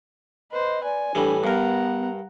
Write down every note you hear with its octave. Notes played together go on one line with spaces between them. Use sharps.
B4 C5 D#5
D5 G#5
A2 E3 G3 D4
G2 B3 A#4 F#5 A#5